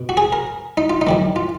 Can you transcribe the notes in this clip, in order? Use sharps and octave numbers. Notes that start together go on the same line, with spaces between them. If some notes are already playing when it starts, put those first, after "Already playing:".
Already playing: B2
F#4
G#4
A#4
D#4
F4
D#4
F#2 D#3 A#3
F4